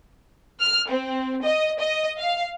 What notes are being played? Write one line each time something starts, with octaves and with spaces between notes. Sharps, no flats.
F6
C4
D#5
D#5
F5